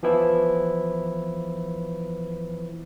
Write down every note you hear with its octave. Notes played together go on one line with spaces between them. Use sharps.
E3 F3 B3 E4